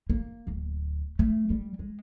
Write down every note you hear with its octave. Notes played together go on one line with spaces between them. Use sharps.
A#3
D1
A3
G3
G#3